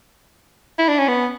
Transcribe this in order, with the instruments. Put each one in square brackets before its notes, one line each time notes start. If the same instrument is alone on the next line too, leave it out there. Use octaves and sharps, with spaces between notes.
[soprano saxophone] E4
D4
C#4
B3